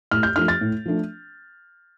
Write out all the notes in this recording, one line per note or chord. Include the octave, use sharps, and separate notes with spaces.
A2 F6
G6
F3 A3 D4 F6
A6
A2
F3 A3 D4